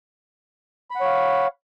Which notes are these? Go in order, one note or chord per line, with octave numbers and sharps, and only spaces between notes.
C#5 F5 F#5 B5